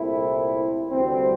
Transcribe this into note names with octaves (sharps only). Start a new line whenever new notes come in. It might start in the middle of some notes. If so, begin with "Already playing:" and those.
Already playing: C2 A#2 A3 C4 E4
D2 C3 E3 G3 C4